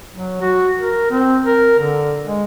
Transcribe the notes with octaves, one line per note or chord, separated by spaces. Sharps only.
F#3
F#4
A#4
C4
A#4
D3
G#3